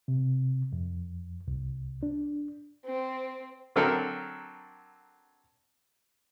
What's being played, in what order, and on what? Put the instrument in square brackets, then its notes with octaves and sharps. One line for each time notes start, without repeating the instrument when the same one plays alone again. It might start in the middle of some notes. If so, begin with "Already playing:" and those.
[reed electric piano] C3
F2
C2
D4
[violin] C4
[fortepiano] D3 F#3 C4 A4 A#4